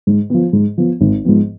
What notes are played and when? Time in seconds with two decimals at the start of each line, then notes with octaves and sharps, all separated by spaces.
0.07 G#2
0.30 F3 B3
0.53 G#2
0.78 F3 B3
1.01 G#1
1.25 G#2 F3 B3